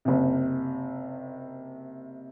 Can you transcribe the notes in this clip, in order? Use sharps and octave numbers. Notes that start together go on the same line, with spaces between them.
F#1 C3